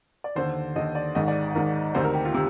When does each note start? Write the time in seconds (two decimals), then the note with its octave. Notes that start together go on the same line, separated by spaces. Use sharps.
0.24 D5
0.35 D#2 D3 C5
0.76 D#2 D3 D#5
0.95 D5
1.15 G#1 G#2 D#3 D#5
1.28 D5
1.55 G#1 G#2 D#3 A#4
1.95 D2 C3 D#3 C5
2.04 A#4
2.14 G4
2.25 F4
2.34 C3 D#3